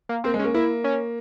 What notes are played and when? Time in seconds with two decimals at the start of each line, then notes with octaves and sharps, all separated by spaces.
0.09 A#3
0.24 A#3 C4
0.34 G#3
0.39 C#4
0.44 A#3
0.54 A#3 E4
0.84 C#4